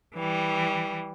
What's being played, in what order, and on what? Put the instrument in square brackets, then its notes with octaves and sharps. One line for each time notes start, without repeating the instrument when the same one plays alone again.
[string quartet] E3 G3